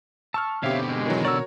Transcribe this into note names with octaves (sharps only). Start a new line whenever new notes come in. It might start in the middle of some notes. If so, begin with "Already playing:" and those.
A5 C#6 E6 F6
B2 D3 C4 G4 C#5 E5 F5
G#3
D#3 E3 F#3
F#4 A#4 C#5 D5 E6